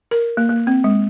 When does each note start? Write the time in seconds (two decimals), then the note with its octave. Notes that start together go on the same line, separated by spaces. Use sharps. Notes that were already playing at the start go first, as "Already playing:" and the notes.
0.11 A#4
0.37 A#3
0.49 A#3
0.67 C4
0.84 G#3